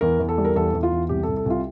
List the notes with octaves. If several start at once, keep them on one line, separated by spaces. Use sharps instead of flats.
E2 A#4
E2
A4
G3
A#4
E2 A4
E2
F4
E2
C2 G4
A4
C2
A4
C2 F4